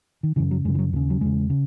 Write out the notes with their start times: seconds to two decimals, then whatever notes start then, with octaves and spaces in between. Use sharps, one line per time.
0.23 D#3
0.36 F#2 C#3 E3
0.51 F#3
0.65 F#2 G#3
0.69 C#3
0.75 E3
0.79 F#3
0.93 D#2 D#3
0.96 C#3
1.10 F#3
1.21 E2 C#3 G#3
1.50 C#3